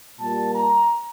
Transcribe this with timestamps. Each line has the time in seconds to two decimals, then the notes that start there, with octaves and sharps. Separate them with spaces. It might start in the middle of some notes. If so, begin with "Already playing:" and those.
0.19 A#2 G3 A#3 A5
0.54 A#5